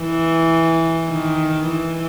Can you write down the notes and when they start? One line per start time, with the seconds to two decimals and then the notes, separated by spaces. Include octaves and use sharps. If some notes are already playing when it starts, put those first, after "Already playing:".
Already playing: E3
1.10 D#3
1.70 E3